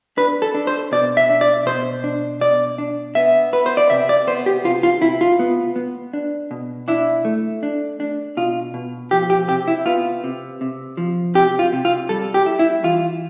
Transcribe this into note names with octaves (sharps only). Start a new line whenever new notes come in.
D4 B4
A4
D4
C5
B2 D5
E5
D4
D5
B2 C5
D4
B2 D5
D4
B3 E5
B3 B4
C5
D5
C3 E5
D5
B3 C5
G4
C3 F4
F4
C3 E4
F4
B3
B3
D4
B2
D4 E4
A3
D4
D4
B2 F4
B2
F3 G4
G4
C3 G4
E4
B3 F4
C3
C3
F3
C3 G4
F4
C3
F4
G3 A4
G4
E4
E4
E3 F4